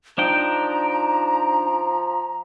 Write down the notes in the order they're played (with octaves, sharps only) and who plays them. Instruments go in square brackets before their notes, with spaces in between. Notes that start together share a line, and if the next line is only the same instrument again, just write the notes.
[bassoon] F3 [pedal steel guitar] D4 D#4 G5 [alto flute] A#5